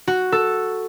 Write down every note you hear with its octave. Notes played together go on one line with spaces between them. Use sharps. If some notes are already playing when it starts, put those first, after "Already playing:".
F#4
A4